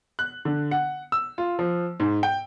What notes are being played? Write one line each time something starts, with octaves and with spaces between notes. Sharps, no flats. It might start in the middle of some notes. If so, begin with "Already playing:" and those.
F#6
D3
F#5
E6
F4
F3
G#2
G5